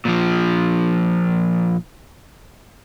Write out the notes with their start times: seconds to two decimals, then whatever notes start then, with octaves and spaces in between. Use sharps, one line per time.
0.05 A#2 F3